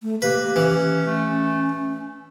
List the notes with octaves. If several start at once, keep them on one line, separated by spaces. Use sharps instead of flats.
A3
A#3 G4 B4
E3 C#4
A3 C#4